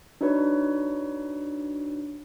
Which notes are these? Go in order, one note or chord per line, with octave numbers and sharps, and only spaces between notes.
D4 D#4 F#4 B4 C#5